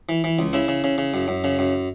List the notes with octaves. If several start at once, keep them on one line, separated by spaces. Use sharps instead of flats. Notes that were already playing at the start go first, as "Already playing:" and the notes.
E3
E3
C#2
C#3 E4
C#3
C#3
C#3
F#2
F#2
C#3
F#2